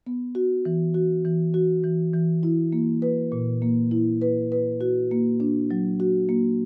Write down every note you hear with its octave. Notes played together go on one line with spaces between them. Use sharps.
B3
F#4
E3
F#4
E3
F#4
E3
E3
E4
A#3
B4
A#2
A#3
E4
B4
B4
F#4
A#3
D4
F#3
F#4
A#3